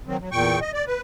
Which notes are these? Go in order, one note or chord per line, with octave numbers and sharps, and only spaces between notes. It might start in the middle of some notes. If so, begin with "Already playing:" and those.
D#3 F#3 C4
F#3
E2 A#2 G5 C#6
D#5
D5
B4